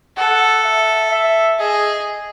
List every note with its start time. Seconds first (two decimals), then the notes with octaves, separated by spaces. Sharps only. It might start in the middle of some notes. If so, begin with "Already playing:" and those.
0.17 A4 F#5
0.64 E5
1.11 E5
1.59 G#4 D#5